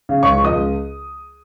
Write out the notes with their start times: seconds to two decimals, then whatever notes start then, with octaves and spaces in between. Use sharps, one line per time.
0.09 C#3
0.23 C#2 C#5 C#6
0.37 F3
0.44 D#5 D#6
0.52 C#2